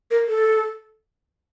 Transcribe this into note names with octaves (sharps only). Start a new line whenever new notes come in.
A#4
A4